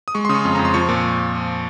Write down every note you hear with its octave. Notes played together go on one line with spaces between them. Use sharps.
D#6
G#3 C#6
C#3 C6 D#6
C#6
F2 C6
F2 A#5
C6
F3 C#6
A#2